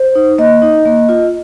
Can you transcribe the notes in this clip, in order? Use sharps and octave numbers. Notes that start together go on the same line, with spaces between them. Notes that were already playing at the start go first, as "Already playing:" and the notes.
Already playing: C5
D#4
A#3 D#5
D#4
A#3
F4